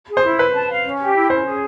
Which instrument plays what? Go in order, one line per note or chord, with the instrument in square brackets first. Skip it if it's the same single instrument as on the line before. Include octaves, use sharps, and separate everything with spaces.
[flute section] G#4
[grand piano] C5
[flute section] E4
[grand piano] B4 [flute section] C5
[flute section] A5
F5
C#4
G4
E4
[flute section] C#4 [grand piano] C5
[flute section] G#4